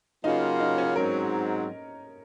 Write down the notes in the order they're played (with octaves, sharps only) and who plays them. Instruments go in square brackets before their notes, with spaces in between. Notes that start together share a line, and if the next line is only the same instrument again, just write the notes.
[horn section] C#3 F#3 A#3 F4 [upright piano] D#4
[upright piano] D#4
C#4
[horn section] G#2 F#3 C4 [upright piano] A#4